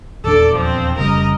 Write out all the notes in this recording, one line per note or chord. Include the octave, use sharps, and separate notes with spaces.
D#1 E2 D4 A4 D5
F3 C4
F1 C#3 G3 A#4 D#5